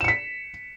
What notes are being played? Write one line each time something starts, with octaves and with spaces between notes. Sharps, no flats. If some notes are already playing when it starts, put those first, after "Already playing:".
B6 C#7 E7